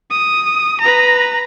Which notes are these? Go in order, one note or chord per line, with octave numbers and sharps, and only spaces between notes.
D#6
B4 A#5